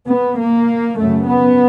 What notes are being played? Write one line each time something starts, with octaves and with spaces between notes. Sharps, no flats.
B3
A#3
F#2 C#3 A3
B3